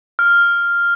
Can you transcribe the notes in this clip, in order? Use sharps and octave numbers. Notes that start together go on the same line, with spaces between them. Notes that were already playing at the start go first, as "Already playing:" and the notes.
F6